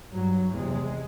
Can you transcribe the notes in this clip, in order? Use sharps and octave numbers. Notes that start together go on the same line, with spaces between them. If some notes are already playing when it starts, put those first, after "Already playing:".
G2 F#3
E2 C3 G#3